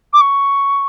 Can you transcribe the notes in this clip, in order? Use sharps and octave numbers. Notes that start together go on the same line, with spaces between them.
D6
C#6